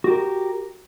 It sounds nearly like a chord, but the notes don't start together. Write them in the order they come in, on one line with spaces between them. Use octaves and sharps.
F#4 G4 A#4